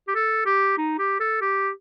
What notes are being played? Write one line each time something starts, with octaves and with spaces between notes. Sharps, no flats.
G4
A4
G4
D#4
G4
A4
G4